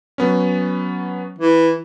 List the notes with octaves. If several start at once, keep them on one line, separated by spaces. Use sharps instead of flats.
F#3 B3 C#4
E3